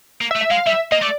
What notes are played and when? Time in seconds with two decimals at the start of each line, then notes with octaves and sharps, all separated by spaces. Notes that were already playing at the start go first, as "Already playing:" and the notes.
0.21 A#3
0.31 E5
0.36 A3
0.41 E5
0.51 G#3 F5
0.66 G3 E5
0.92 A#3 D#5
1.01 A3 D5